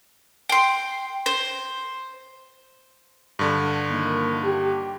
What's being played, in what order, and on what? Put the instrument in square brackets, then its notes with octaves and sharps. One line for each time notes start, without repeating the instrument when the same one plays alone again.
[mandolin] G5 C6
C5
[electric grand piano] G2 D3
[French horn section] D#3 F3 A#3
G4